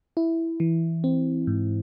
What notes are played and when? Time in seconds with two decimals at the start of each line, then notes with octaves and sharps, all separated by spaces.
0.17 E4
0.60 E3
1.04 C4
1.47 G#2